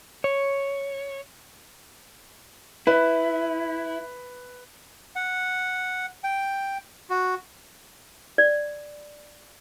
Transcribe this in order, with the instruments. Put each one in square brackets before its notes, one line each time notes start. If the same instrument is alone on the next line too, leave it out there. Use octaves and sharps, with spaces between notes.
[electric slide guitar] C#5
[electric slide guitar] E4 [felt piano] B4
[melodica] F#5
G5
F#4
[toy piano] D5